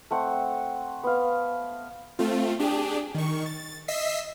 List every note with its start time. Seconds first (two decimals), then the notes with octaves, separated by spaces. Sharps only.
0.10 A3 C4 F#5
1.03 B3 F5
2.19 A3 C4 F4
2.59 D4 G4 G#4
3.14 D#3 C#6
3.46 A6
3.88 D#5 E5 E6 B6 C7